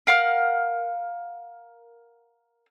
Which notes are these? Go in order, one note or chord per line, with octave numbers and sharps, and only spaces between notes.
A#4 F5 F#5 F6